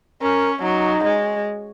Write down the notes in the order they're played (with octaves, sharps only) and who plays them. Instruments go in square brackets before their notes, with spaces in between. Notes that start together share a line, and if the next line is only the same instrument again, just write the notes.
[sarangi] C#4 [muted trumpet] A#4
[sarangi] F#3 [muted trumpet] D#4
[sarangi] G#3